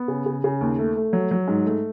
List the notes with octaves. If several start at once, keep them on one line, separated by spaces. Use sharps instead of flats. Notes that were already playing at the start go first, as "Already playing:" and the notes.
Already playing: B3
C#3
C#3
C#3
D#2
A3
A3
F#3
F#3
G#2
A3